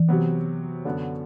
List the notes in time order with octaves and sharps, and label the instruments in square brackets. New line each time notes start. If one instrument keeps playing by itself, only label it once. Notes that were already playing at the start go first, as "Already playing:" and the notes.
Already playing: [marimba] E3
[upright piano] C3 F#3 B3
F#2 D3 F#3 B3